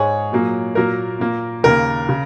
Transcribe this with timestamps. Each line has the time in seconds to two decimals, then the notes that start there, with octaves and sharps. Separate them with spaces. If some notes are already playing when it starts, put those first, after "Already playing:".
Already playing: G#2 G#3 G#4 C#5
0.32 A#2 F#3 A#3
0.75 A#2 F#3 A#3 A#4
1.19 A#2 A#3
1.63 D#2 C#3 A#3 A#4
2.09 C#3